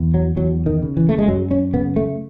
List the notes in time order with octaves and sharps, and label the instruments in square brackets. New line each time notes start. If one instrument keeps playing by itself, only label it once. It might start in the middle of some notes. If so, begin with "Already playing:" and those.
Already playing: [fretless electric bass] E2
F#3
E2 F#3
D#3
C#3
E3
A3
G#3
F#2 F#3
C#4
C#3 B3
A3